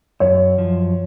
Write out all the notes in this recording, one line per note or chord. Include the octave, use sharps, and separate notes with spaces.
F#2 C#5
F3